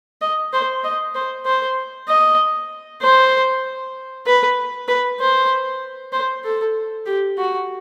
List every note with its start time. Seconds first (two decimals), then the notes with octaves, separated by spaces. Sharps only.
0.21 D#5
0.53 C5
0.84 D#5
1.15 C5
1.46 C5
2.09 D#5
3.02 C5
4.26 B4
4.88 B4
5.20 C5
6.12 C5
6.44 A4
7.06 G4
7.38 F#4